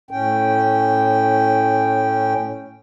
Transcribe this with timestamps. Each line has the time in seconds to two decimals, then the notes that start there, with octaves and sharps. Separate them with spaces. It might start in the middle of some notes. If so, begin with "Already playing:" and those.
0.11 A2 C#4 G5